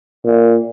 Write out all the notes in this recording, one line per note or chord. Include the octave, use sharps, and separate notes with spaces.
A#2